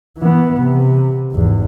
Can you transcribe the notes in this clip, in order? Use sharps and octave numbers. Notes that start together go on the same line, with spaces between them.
E3 B3
C3
G#1 E2